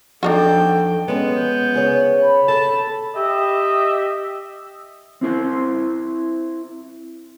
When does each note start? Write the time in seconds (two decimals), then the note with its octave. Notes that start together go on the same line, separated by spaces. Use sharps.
0.23 F2 D4 D#4 F#4 A4 G5
1.08 G#3 B3 C#4
1.35 G6
1.74 C#3 G#4 C#5
2.22 B5
2.48 A4 A5
3.15 G4 D#5 E5
5.21 C4 E4 C5